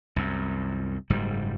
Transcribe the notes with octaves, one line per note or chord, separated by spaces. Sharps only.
C2 F#2
F#1 G#2 G3